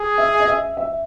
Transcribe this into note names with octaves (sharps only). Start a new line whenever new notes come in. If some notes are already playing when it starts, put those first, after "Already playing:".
Already playing: G#4
E5
D#5
E5
E5